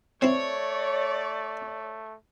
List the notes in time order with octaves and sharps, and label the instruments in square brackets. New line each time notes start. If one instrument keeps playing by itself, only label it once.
[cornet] A3 [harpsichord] C4 E4 [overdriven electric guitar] C#5 [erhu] D5